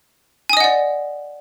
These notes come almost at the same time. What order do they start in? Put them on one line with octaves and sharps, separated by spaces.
G#5 D#6 D#5 F#5 D5